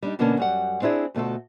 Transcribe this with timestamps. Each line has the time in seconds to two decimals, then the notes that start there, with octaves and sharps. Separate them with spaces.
0.03 G3 D4 D#4
0.19 B2 D3 A#3 B3 C#4 A5
0.37 F#2 G3 F#5
0.82 C4 D4 E4 G#4
1.14 D2 B2 A3 F4 A4